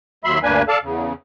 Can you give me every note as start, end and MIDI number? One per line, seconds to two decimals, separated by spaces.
0.24 0.39 39
0.24 0.39 54
0.24 0.39 76
0.24 0.39 83
0.24 0.39 84
0.43 0.62 38
0.43 0.62 43
0.43 0.62 58
0.43 0.62 62
0.43 0.62 71
0.43 0.62 80
0.68 0.78 69
0.68 0.78 74
0.68 0.78 77
0.68 0.78 81
0.82 1.13 40
0.82 1.13 49